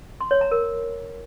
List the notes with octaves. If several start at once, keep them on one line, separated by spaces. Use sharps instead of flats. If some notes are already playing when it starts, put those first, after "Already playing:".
C6
C#5
A#5
A#4